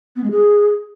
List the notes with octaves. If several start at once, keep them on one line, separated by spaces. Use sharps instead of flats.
B3
G#3
G#4